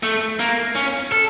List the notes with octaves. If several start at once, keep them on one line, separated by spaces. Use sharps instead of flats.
A3
A#3
C#4
A4